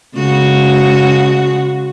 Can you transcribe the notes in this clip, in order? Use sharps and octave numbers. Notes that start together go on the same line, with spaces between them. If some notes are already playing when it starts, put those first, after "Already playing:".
C#3 G#3 F#4